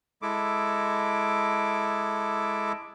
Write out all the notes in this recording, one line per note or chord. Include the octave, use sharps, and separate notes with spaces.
G#3 E4 A4 D6